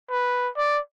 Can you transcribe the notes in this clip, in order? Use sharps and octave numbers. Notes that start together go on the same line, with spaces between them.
B4
D5